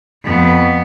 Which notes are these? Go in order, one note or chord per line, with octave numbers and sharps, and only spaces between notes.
F2 B3